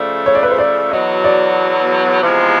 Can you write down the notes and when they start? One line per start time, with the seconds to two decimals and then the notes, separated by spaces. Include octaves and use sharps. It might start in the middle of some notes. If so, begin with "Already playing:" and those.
Already playing: C#3 F3 A3 D5
0.26 C#5
0.35 D5
0.43 B4
0.51 C5
0.59 D5
0.91 E2 B2 F#3 D#5
1.24 D5
2.20 E2 C3 F3 G#3